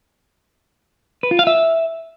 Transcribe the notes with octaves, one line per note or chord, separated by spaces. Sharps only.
B4
F4
F5
E5